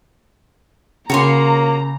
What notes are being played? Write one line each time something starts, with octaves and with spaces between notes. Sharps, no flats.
C#3 A#3 F#4 C#5 A#5 C6